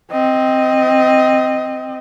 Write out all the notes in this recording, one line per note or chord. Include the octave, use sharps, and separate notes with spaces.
C4 D#5